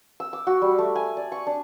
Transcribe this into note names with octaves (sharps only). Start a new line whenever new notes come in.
E6
D6
F#4
G3
A3
G#5
D5
C#6
D4